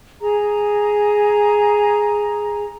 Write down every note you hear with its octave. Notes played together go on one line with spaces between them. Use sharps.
G#4 A#5